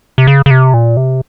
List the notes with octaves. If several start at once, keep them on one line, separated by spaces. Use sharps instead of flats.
C3
C#3
C#3
C3
A#2
C3